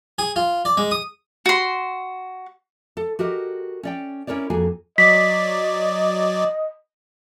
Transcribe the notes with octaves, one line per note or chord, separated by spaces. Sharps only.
G#4
F4
D5
G#3
D#6
F#4 C6
A4
F#4 G4 A#4 D#5
C#4 D5 G5
C#4 E4 A#4 C#5 D5
F2 A#3 F#4 G#4 G#5
F#3 D5 D#5 B6